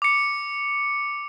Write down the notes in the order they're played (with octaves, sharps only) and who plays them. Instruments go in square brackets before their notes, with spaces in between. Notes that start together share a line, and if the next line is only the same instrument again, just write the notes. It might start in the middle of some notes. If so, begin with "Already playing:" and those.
[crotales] D6 C#7